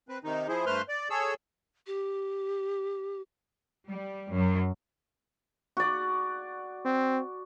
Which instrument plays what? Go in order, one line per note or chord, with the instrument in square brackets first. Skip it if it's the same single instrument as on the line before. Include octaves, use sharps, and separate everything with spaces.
[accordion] C4 B4
C3 D#3 D#4
F3 E4 G#4 C5
G2 A3 B4 C5 C6 F6
D5
G#4 A4 C#5 E6
[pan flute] G4
[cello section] G3
F#2
[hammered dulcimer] F#4 D5
[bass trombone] C4